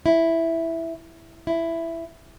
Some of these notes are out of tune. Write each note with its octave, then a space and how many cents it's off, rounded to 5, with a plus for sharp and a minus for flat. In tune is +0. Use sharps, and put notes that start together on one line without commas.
E4 +0
E4 +10